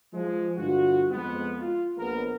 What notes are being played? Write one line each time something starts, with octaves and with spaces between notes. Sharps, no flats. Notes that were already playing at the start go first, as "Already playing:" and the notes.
F3 G#3
G2 D3 F4 F#4
F2 G#3 B3
F4
A#1 B3 A#4